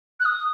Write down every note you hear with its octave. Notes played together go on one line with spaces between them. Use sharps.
F#6
D#6